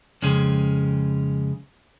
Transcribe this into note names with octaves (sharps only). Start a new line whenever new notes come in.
F2 C#3 G#3 C#4